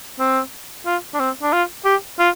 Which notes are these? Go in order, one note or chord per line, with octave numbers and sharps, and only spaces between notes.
C4
F4
D4
C4
D4
F4
G4
F4